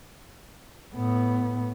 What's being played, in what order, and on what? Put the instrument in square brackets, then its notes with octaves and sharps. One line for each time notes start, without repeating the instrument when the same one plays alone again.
[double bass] A2 B3